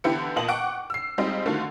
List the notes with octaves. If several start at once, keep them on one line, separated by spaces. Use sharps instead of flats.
D3 E3 B3 E4 G4 C#7
A#2 A#3 B3 D#5 A5 F#7
F#5 G5 C#6 D6 D7
E6 C7
G3 G#3 C4 D#4 F4
D3 D#3 A3 F4 F#4